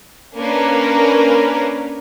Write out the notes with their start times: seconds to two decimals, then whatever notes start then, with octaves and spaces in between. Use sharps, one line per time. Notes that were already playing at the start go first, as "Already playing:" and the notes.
0.35 A#3 C#4 D4 A#4 B4